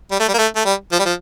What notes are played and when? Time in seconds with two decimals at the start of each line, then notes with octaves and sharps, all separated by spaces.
0.11 G3
0.20 A3
0.28 G3
0.33 A#3
0.38 A3
0.56 A3
0.65 G3
0.92 F3
0.99 G3
1.05 F3